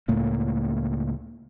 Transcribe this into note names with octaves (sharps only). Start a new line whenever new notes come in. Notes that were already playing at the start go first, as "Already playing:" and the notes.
C#2 A2 A3 A#3